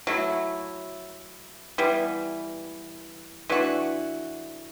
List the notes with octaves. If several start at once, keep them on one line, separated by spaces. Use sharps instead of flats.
F#3 A3 E4
E3 G3 B3
E3 A3 D4 F#4